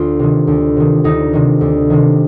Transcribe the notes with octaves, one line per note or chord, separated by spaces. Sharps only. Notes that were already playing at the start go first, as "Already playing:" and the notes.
Already playing: D2 F4
C3 D#3
D2
C3 D#3
D2 D#4
C3 D#3
D2
C3 D#3